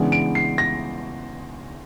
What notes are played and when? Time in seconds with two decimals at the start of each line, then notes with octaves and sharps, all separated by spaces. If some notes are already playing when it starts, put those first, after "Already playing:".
Already playing: C#3 E3 G#3 B3 D4
0.12 D7
0.35 C7
0.58 A#6